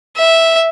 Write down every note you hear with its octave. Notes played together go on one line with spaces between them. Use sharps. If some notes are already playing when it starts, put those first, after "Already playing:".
E5